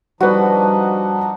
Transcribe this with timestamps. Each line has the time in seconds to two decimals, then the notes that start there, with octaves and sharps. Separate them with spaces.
0.20 F3 G3 D4 D#4 F#4 B4